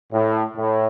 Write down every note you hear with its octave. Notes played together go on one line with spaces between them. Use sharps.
A2
A2